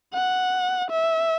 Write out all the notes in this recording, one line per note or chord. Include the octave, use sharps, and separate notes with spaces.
F#5
E5